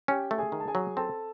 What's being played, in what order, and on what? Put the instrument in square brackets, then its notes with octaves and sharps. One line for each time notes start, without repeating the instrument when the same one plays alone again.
[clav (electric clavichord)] C#4 [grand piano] G4 G5
[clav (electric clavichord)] A3
[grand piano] G#4 G#5
[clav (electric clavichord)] D#3
[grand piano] A5
G#4 G#5
[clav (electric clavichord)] F#3
[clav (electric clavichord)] C4 [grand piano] A4 A5